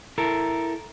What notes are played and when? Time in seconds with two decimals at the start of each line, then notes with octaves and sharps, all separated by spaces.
0.18 E4 A4 A#4